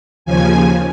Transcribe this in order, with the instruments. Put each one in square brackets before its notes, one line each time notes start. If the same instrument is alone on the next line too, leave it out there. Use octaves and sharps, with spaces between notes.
[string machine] D#2 C#3 F3 G#5